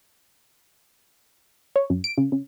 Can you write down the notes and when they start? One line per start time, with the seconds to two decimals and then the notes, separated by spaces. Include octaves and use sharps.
1.76 C#5
1.90 F#2
2.04 D7
2.17 C#3
2.32 C#3